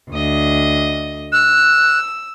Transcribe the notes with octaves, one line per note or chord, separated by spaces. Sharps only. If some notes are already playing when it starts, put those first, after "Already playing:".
D2 D#5
E6 F#6